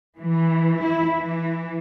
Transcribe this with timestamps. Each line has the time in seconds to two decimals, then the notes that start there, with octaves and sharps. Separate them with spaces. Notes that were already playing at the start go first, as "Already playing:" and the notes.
0.19 E3
0.81 E4
1.20 E3